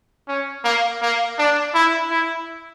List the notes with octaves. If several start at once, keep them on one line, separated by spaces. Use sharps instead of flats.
C#4
A#3
A#3
D4
E4
E4